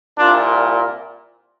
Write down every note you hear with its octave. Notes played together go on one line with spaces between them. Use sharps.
C2 A#2 D4 F4